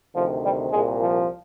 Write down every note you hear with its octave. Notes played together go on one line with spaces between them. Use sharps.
D2 C3 D#3 F3
G3
C2 A#2 G#3
F3